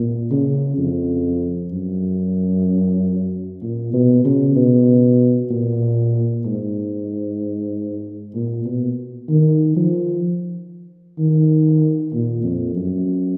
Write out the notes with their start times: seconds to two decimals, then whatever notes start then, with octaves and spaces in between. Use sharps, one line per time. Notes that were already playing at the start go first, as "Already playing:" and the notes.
Already playing: A#2
0.31 C#3
0.78 F2
1.72 F#2
3.62 A#2
3.94 B2
4.25 C#3
4.56 B2
5.51 A#2
6.46 G#2
8.35 A#2
8.66 B2
9.29 D#3
9.76 F3
11.19 D#3
12.13 A#2
12.44 F2
12.76 F#2